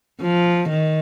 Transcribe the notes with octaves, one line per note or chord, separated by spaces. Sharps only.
F3
D#3